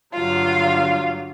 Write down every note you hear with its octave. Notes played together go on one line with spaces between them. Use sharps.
G2 D3 F#3 F4 F5